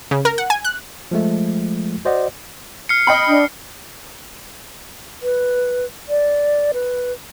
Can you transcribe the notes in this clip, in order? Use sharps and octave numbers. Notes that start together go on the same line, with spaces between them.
C#3
A#4
F#5
G#5
F#6
F3 G#3 A3
F#4 C5 D5 D#5 F#5
F6 C7 C#7
D#5 G5 B5
D4
B4
D5
B4